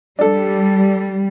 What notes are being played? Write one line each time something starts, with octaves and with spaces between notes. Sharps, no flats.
G3 D4 A4